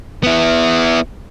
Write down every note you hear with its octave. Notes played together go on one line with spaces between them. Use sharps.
B3 E4